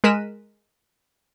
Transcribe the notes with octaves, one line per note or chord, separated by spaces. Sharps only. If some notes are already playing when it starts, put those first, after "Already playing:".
G#3 A#4 F#6 B6 D#7 E7